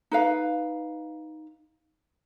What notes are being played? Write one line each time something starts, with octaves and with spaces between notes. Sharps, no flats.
D#4 B4 F5